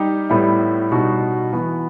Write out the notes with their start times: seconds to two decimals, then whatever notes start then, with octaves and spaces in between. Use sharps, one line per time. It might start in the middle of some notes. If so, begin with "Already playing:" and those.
Already playing: G3 D#4 G4
0.29 A2 G3 B3 E4
0.91 B2 G3 D#4 F#4
1.53 E3 B3 F#4